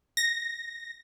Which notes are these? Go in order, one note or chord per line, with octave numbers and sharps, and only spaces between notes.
A#6